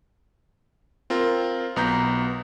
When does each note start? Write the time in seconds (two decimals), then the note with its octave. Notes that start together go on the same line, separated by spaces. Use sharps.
1.10 C4 F4 A#4
1.76 B1 B3 A#5 G6